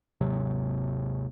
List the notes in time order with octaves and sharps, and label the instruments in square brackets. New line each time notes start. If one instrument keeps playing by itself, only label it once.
[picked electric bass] G#1 D#2 C3 F#3